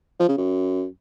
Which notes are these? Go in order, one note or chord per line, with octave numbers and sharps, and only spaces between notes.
F3
C#3
F#2